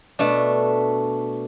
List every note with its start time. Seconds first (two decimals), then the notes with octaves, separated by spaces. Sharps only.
0.19 B2 A3 D4